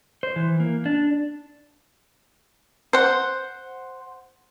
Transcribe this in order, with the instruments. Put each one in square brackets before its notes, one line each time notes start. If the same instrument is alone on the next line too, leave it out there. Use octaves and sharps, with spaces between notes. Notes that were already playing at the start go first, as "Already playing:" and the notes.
[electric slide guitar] C5
E3
A#3
D4
[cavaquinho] C5 F#5